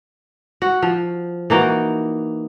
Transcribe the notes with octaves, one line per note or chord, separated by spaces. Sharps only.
F#4
F3
E3 A#3 D#4 F#4